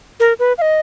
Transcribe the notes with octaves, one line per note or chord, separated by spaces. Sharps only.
A#4
B4
F5
D#5